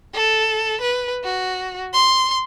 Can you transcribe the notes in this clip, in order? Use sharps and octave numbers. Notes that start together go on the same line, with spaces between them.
A4
B4
F#4
C6